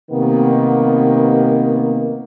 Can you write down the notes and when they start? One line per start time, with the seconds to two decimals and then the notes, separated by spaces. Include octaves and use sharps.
0.11 C3 D#3 A#3 B3